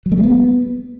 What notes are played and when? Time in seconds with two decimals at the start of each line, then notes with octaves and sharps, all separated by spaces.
0.06 F#3
0.12 A3
0.18 G3
0.23 B3